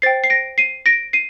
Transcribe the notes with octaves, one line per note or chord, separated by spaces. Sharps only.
C5 G5 A6 C7
C7
A#6 D7
C7 D#7
A#6 D7
C7 D#7